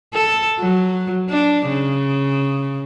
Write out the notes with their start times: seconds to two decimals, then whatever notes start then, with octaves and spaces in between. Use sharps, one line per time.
0.14 A4
0.60 F#3
1.30 D4
1.67 C#3